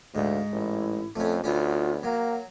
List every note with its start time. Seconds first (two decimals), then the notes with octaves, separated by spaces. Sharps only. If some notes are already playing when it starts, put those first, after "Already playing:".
0.15 D2 G#2 F5
0.52 A1 E4
1.16 F2 A3 C#4
1.44 D2 B3 C#4 F4
2.03 F#3 A#3 F#5